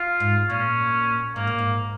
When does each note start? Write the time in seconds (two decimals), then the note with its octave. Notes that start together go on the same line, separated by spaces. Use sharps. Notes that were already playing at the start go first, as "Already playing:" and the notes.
Already playing: F4
0.20 G#2
0.50 A#2 C#4
1.36 G#2 A#3
1.47 A#2
1.59 G#2